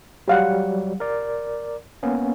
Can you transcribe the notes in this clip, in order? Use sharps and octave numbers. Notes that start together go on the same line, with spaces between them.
F#3 G3 G4 F5 F#5
A#4 D5
A#3 B3 C#4